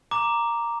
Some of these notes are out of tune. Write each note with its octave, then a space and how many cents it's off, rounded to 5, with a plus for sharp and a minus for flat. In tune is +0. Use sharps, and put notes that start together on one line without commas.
A#5 +0 D6 +0